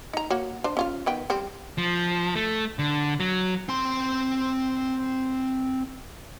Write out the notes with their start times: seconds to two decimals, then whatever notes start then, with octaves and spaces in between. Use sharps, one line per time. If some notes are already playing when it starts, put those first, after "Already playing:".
0.13 D#4 A#5
0.30 A#3 F#4 C#5
0.64 D4 C5
0.77 C#4 F4 F5
1.06 D#3 B3 G5
1.30 G3 C4
1.78 F3
2.36 A3
2.79 D3
3.20 F#3
3.69 C4 C6